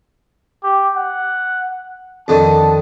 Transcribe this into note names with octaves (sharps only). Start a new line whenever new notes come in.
G4
F#5
F2 D3 D#3 A5